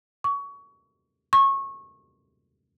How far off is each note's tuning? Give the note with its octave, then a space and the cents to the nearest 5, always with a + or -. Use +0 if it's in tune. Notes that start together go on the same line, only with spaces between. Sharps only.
C#6 +25
C#6 -20